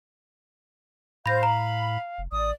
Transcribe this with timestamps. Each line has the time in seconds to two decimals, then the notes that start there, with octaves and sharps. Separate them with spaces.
1.26 A2 C5 F5 B5 G6 A#6
1.43 A#5 B5
2.18 F1
2.32 A1 D5 D#6